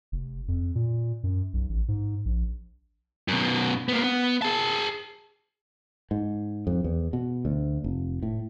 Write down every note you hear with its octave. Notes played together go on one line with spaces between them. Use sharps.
F1
F2
A#2
F#2
B1
A1
G#2
A#1
F#2 B2
A#3 B3
B3
G#4 A5
G#2
F2
E2
B2
D2
F1
A2